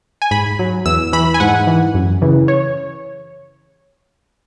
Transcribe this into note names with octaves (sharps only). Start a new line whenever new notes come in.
G#5
G#2 B5
F#3
E2 E6
E3 B5
G#5
G#2 F#5
E3
F#2
C#3 E3
C#5